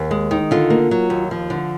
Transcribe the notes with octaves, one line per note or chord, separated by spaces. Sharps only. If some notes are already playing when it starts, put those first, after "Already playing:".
Already playing: D#2
G#3
D#3
D3 F4
A#3
F#3
D#2
F3
D3